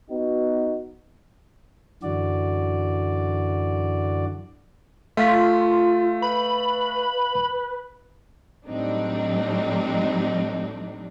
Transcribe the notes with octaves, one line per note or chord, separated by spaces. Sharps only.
B3 D#4 F#4
F#2 D3 E3 F#4 D5
A3 F4 E5 F5 B6
B4 B5
A2 F#3 G3 C4 D4 D#4